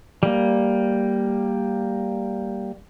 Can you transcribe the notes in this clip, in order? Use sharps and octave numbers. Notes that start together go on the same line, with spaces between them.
G3 A#3